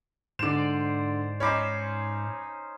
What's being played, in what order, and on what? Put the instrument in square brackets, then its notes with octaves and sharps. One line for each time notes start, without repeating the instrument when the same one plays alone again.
[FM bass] G#2 [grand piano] D3 E7 [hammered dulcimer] C5 D5
[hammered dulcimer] C#4 D#4 C5 [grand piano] C#5 B5 D6